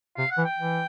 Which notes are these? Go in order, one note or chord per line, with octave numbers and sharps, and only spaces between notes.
C3 F5
F#5
E3
G5
E3